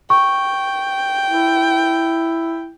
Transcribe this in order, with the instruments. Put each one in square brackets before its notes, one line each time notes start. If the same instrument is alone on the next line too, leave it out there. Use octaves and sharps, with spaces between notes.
[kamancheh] G5 [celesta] C#6
[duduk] E4